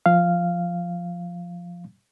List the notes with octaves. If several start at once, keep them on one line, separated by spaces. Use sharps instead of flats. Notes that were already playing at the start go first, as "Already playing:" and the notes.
F3 F5